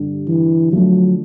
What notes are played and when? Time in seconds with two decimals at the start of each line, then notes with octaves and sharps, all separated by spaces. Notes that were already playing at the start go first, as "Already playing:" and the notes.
Already playing: G2 D3 G3
0.28 E3
0.72 D3 F3 F#3 A3